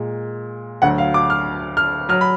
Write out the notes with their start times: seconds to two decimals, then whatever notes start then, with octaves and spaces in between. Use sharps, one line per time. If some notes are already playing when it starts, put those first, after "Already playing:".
Already playing: A#2 G#3
0.82 D2 D3 F#3 F#5
0.98 F5
1.14 D6
1.30 F6
1.77 F6
2.09 F#3 F6
2.21 B5